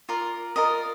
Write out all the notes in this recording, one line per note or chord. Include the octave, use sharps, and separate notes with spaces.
F4 A#4 D5
F4 A#4 D5 D#5